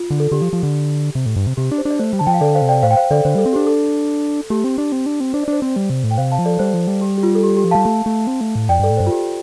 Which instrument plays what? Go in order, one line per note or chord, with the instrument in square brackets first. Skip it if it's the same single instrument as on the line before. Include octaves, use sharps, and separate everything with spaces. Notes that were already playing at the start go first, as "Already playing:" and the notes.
Already playing: [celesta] F4
[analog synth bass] D3
[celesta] A4
[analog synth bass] D3 [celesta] G4
[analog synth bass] F3
F3
D3
C3
A2
G2
C3
[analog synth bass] C3 [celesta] G4
[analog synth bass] D4
[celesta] C5
[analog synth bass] D4
[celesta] D5
[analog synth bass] A3 [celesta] C5
[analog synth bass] G3
[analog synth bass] D3 [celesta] A5
[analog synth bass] F3 [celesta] G5
[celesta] F5
[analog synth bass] D3 [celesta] A4 D5
[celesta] C5 F5
[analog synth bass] C3
[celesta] D5 G5
[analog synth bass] A2 [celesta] C5 F5
[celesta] G5
C5 F5
[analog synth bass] D3 [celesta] A4 D5
[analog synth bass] D3 [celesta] C5
[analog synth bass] G3 [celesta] A4
[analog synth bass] C4
[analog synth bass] D4 [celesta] G4
[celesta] A4
[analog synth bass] A3 [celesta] G4
[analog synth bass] C4
D4
C4
D4
C4
[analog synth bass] D4 [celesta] C5
[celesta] D5
[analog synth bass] D4 [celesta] C5
[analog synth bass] C4
G3
C3
A2
[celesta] G5
[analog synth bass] C3 [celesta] C5 F5
[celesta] F5 A5
[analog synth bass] F3
[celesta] A4 D5
[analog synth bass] G3 [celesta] C5
[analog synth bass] F3
G3
[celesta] G4
G4
F4
A4
G4
G4
[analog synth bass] F3
[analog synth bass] G3 [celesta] F5 A5
[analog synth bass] A3
A3
C4
A3
A2
[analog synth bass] F2 [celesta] D5 G5
[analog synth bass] G2 [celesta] A4 D5
[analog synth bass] A2
[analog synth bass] G2 [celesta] C5
[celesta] F4
G4